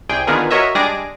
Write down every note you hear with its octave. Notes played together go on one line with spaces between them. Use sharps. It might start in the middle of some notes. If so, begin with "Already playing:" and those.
C2 G#4 G5
D3 D#3 B3 F4 G#4 A#4
F#4 A#4 C#5 D#5 E5
G3 G#3 D4 G#4 D6 A#6